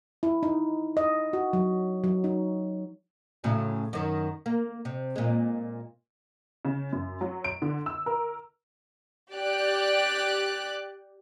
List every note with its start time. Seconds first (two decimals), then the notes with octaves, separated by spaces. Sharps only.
0.23 E4
0.43 D#4
0.97 D#5
1.33 F#4
1.53 F#3
2.04 F#3
2.24 D#4
3.44 A2 C#3 F#3
3.93 F#2 D#3
4.46 A#3
4.85 C3
5.16 A#2 G#3
6.65 C#3
6.92 F#2
7.21 F#3
7.44 D7
7.62 D3
7.86 E6
8.06 A#4
9.34 G4 D5 F#6